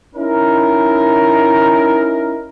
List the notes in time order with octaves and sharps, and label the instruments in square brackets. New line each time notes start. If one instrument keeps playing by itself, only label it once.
[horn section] C#4 D#4 E4 A#4